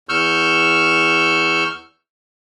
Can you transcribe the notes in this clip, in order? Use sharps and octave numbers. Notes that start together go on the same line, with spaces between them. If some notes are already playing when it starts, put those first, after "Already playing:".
E2 C#6 E6 F6 G6